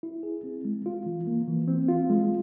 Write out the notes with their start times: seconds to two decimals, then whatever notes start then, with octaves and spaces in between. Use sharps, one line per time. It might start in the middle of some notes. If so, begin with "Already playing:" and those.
0.03 E4
0.23 G#4
0.44 C4
0.65 G#3
0.86 F4
1.06 E3
1.27 A#3
1.48 E3
1.68 C4
1.88 F4
2.09 G#3